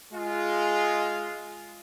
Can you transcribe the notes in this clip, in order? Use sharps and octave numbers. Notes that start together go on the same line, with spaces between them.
G#3 F4